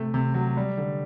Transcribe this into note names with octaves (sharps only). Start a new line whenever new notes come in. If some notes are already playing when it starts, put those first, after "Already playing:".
Already playing: C3 A3
C3
F#3
G3
D3